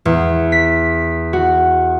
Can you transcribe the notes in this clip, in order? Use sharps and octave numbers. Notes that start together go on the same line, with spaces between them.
E2
B6
F#4